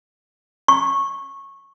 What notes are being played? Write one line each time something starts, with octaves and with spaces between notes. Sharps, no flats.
C#6